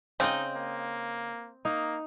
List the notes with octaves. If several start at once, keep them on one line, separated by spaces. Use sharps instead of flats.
C#3 C4 D#4 D#5
A#3
A#3 D#4